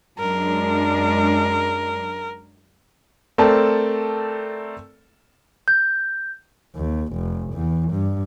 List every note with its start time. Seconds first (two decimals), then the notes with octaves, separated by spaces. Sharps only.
0.18 F#2 G#3 D4 A#4
3.38 A3 C4 A4 A#4 D5 A5
5.68 G6
6.76 D#2
7.14 F1
7.53 E2
7.91 G2